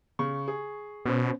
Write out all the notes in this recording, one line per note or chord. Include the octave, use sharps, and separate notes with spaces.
C#3 C#6
G#4
B2 B3 C#4 C5